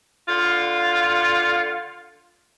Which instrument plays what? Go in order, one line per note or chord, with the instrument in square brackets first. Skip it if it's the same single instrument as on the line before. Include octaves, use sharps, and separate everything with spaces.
[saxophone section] D3 F4